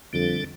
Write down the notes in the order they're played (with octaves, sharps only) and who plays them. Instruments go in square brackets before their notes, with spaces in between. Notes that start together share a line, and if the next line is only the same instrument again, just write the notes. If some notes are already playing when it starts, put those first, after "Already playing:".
[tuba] F2 [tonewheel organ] D3 G3 D4 A4